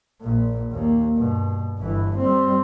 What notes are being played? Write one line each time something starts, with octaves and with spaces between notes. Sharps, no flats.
A#1 A#2
D#2 A#3
G2 B2
G1 E3
G3 C4